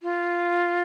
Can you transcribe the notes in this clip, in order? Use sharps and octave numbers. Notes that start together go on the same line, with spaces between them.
F4